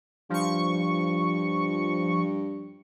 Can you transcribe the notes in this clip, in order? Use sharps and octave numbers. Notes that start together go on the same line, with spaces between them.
G2 F3 C#6